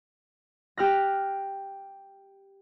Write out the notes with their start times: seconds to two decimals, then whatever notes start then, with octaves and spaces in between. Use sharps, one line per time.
0.77 G4 F6 F#6 A#6